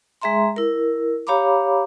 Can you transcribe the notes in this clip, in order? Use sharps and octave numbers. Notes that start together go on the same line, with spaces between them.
G#3 G#4 E5 A#5 C6
E4 A#4
G4 C#5 F5 A#5 B5 D6